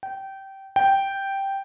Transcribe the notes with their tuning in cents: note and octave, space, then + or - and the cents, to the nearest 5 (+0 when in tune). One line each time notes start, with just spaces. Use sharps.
G5 -20
G5 -5